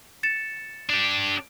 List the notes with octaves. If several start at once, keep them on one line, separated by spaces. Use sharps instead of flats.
A6 C#7 E7
D4 G4